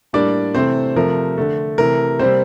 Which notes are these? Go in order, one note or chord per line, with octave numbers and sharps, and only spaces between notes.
A2 G3 A#3 D4 D5
C3 E3 A3 C4 C5
C3 F3 A3 A#4
D3 A3
C3 E3 A3 A#4
C3 G3 A#3 C4 C5